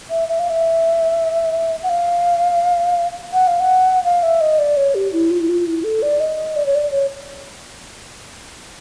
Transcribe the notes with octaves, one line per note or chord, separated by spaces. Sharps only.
E5
E5
F5
E5
F#5
F5
F#5
F5
F#5
F5
E5
D#5
D5
C#5
G4
E4
F4
E4
F4
E4
A4
D5
D#5
D5
C#5
D5
C#5